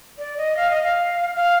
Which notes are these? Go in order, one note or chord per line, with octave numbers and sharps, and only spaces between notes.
D5
D#5
F5
D#5
F5
F5